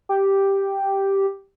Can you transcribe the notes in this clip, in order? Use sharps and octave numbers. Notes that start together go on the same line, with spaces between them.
G4